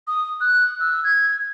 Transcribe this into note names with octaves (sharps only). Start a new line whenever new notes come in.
D#6
F#6
E6
G#6